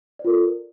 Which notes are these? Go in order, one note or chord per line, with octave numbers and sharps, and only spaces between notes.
F4 A4 A#4 C5 D5